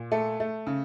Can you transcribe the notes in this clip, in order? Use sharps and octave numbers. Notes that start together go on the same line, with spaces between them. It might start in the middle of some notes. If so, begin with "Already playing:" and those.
Already playing: A#2
A3 A4
A3
C#3